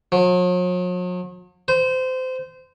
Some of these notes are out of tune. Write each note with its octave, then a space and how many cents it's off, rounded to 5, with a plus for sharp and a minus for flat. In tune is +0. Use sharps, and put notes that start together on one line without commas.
F#3 -45
C5 -25